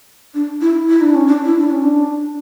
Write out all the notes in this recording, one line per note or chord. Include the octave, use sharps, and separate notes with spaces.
D4
E4
E4
D4
C#4
D4
E4
D4
C#4
D4